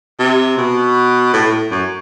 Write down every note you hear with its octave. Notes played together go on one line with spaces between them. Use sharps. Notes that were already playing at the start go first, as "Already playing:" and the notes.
C3
B2
A2
A2
F#2